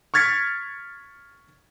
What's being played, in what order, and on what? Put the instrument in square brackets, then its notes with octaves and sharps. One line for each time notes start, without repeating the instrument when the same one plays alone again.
[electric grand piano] C#6 F6 G#6 A6 B6 C#7